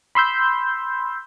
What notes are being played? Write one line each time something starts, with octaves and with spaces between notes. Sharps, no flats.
B5 C6 E6 G6